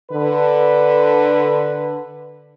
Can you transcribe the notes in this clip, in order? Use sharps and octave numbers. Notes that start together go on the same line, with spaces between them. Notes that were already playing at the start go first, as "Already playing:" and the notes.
D3 B4